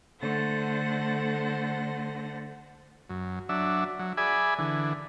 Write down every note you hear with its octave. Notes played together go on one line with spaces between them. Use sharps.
D3 A3 A4 C5 F#5 A#6
F#2
F#3 D4 E5
F#3
G#4 D5 E5 G#5 B5
D3 E3